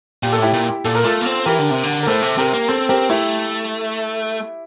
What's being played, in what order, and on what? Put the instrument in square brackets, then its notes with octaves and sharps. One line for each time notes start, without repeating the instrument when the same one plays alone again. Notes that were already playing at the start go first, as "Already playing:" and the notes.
[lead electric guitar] A#2 [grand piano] G4
[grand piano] A4
[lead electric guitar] A2 [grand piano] E4 G4
[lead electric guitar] A#2
[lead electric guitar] A#2 [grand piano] A4
[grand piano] A#4
[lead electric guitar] A3 [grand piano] F4 A4
[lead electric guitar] A#3
C4
[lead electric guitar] E3 [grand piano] G4 A#4
[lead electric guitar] D3
C3
D3
[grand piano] A#4
[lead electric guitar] A2 [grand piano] A4 C5
[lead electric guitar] C3
[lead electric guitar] C3 [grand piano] G4 A#4
[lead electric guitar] A#3
[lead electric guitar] C4 [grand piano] A4 C5
[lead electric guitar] C4 [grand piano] G4 A#4
[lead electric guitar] A3 [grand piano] E4 G4